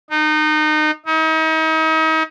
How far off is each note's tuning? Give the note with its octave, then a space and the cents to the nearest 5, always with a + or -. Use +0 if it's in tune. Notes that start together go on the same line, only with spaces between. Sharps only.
D#4 -25
D#4 +40